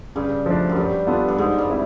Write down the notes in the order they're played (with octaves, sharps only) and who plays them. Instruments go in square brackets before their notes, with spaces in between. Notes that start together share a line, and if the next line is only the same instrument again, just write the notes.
[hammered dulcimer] G2 [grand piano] C#3
[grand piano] F3 A3 D4
[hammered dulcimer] F#2
[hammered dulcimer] G2 [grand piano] G3
[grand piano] B3 D4 F4 A4
[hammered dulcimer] G2
[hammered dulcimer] G#2 [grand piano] G#3
[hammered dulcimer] G2
[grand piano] C4 E4